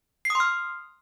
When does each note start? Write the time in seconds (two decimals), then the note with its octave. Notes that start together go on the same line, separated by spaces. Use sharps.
0.25 C7
0.30 D#6
0.35 C6
0.40 F6